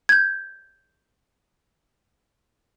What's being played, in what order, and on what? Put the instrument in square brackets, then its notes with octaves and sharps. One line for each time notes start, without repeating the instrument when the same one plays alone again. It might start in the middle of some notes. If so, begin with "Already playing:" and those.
[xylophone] G6 G#6